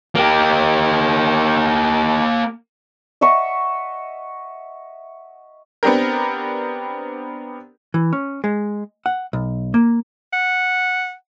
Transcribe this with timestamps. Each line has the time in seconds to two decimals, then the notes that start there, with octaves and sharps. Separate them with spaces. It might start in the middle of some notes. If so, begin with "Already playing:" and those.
0.15 A#3 G4
3.21 D#5 E5 F#5 C#6
5.83 B3 C4 D4 G4 A#4
7.94 E3
8.13 C#4
8.44 G#3
9.06 F#5
9.33 B1
9.74 A#3
10.33 F#5